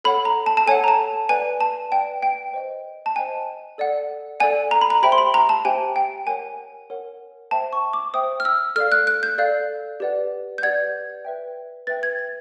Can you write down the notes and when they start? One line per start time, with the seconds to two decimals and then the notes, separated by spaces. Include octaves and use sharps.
0.04 A4 C#5 F#5 B5
0.25 A#5
0.46 A5
0.57 A5
0.66 A4 C#5 F#5 G#5
0.84 A#5
0.88 A5
1.29 B4 D5 F#5 G#5
1.61 A5
1.91 B4 D5 F#5 G5
2.22 G5
2.54 C5 D#5 G5
3.06 A5
3.16 C5 D#5 G5 G#5
3.78 A4 D5 F#5
4.40 A4 D5 F#5 G#5
4.71 A#5
4.81 B5
4.90 A#5
5.02 G4 C5 E5 G5 B5
5.12 C6
5.18 B5
5.34 A#5
5.49 A5
5.65 G4 C5 E5 G5 G#5
5.96 G5
6.27 A#4 C#5 F#5 G#5
6.90 A#4 C#5 F#5
7.51 C5 E5 G5 A5
7.73 C#6
7.93 D6
8.14 C5 E5 G5 D#6
8.40 F6
8.45 E6
8.76 A4 D5 F5 F6
8.92 F#6
9.07 F#6
9.23 G6
9.38 A4 D5 F5
10.00 G4 B4 D5 F#5
10.58 G6
10.63 G4 B4 D5 F#5 G#6
11.25 B4 E5 G5
11.87 B4 E5 G5 A6
12.03 G#6
12.19 A6